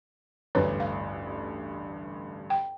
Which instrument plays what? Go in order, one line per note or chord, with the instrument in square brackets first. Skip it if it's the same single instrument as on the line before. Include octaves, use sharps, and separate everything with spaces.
[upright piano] A1 D2 G2 [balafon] D4 B4 C#5
[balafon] F5
G5